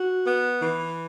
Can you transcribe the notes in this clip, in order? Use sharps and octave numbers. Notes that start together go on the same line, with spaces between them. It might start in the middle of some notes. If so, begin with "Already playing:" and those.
Already playing: F#4
B3
E3